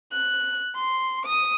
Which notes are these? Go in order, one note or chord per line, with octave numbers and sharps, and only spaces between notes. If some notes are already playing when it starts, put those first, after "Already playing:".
F#6
C6
D#6